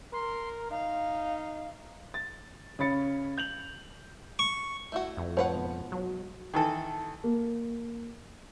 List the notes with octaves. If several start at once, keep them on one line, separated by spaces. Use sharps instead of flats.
A#4 C6
D#4 F5
A6
C#3 C#4 B5 A6 C#7
G6 F7 F#7
C#6
A3 E4 F#4
F2
A1 F3 B4 C#5 F#5 F7
G#2 B2
F#3
D#3 E3 A4
A#3